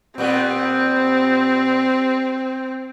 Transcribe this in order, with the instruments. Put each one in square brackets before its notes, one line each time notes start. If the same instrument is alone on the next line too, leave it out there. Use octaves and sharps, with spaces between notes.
[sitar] A#2 G3 B3 [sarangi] C4